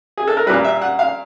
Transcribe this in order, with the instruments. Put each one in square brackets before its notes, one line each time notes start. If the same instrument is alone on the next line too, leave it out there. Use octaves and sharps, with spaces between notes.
[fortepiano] G#4
A4
A#4
G3 B4
A#2
E5
F#5
F5